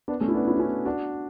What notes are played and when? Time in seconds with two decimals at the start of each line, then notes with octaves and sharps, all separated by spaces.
0.08 B3 D4
0.20 A3 C#4
0.28 E4
0.34 B3 D4
0.47 C#4 E4
0.54 F#4
0.59 C#4 E4
0.85 D4 F#4